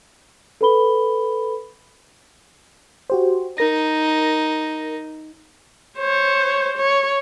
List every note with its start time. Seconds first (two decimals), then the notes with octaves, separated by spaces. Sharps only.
0.61 A4 B4 B5 G7
3.10 F#4 G4 C5
3.58 D#4 A#4 A#6
5.98 C5 C#5
6.77 C#5